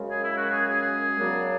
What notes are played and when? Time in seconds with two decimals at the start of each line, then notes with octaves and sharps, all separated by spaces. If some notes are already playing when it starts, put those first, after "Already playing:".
Already playing: F#2 C#3 G#3 C#4
0.11 G#4
0.24 E4
0.38 F#4
0.51 G#4
0.65 G#4
1.19 F#2 C#3 F#3 B3 D4